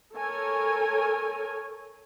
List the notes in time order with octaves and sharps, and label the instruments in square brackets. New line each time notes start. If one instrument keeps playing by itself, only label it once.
[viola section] A4 A#4 C#5 G#5